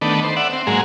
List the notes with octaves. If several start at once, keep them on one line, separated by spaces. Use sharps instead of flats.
D#3 A3 B3 D4
C5
D5 E5 F#5
C4
G#2 F#3 G#3 A#3